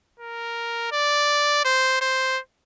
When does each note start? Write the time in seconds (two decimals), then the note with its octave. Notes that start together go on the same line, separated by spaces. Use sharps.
0.20 A#4
0.92 D5
1.65 C5
2.01 C5